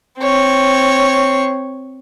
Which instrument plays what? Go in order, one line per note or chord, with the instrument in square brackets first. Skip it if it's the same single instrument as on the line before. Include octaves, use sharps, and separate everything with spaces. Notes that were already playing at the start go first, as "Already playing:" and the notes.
[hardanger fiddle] C4 C#5